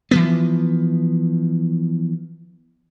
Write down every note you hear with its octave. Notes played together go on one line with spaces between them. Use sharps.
E3 F3 B3